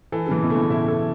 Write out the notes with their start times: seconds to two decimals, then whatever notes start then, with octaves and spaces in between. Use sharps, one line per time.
0.12 E3 A4
0.26 C#3
0.31 E3
0.42 B2
0.50 A3
0.55 A2
0.70 B2 E4
0.88 A4